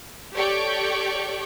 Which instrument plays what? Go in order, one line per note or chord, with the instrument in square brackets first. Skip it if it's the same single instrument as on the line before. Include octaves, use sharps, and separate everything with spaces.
[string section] G4 A4 C#5 D5 G5 C#6